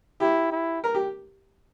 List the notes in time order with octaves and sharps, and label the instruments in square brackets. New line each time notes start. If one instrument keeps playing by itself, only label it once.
[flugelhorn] E4 [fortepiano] G4
[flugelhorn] E4
[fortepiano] A#4
G4